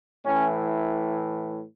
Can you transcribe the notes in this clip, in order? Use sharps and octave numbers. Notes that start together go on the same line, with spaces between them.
A2 E3 C#4